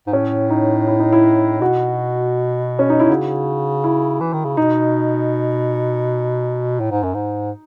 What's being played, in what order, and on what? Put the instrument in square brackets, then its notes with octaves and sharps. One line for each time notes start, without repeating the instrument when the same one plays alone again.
[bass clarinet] G#2
[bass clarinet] A2 [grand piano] C#4
[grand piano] D#4
E4
D#4
E4
[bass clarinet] B2 [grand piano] F#4
[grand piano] C#4
D#4
[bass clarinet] B2 [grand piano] E4
[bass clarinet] C#3 [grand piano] F#4
[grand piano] E4
[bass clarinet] E3
D#3
C#3
[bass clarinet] B2 [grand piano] D#4
[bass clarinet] A2
G#2
F#2
G#2